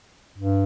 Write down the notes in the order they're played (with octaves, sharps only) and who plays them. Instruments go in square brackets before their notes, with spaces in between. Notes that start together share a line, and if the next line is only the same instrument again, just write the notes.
[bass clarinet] G2